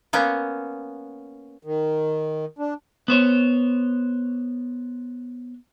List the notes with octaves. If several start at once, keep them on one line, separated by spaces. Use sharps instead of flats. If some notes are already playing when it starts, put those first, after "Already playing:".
A#3 B3 C#4
D#3
D4
B3 C5 C#5